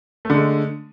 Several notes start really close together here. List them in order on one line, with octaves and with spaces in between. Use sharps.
A3 D3 G#3